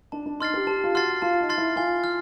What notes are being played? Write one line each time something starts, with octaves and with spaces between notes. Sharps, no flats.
D4 A5
D4
D#4 C6 F6 A6 C7
G4
G4 A5
F4
F#4 C6 F6 A6 C7
F4 A5
D#4
C6 F6 A6 C7
E4
F4 G#5
F6